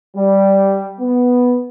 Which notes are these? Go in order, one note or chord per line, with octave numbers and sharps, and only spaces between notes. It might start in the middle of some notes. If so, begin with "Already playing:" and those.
G3
B3